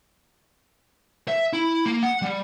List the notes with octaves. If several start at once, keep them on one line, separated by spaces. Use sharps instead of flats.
E5
E4
A#3
F#5
G3